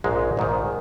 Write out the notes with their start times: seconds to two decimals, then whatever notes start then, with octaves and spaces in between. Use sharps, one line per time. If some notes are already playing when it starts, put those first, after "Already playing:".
0.04 A#1 G#2 G#3 D#4
0.37 A#1 G#2 D#3